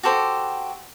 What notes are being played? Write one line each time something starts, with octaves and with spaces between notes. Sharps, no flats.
F#4 G4 A4 C5